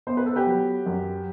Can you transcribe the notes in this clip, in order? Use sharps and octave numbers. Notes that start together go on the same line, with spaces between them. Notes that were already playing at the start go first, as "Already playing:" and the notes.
B3 C5
B4
A4
G4 B4
F#3
F#2